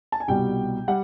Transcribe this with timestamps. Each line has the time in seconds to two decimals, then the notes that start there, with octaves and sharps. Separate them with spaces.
0.12 A5
0.20 G#5
0.28 C2 B2 G3 G5
0.88 G3 F#5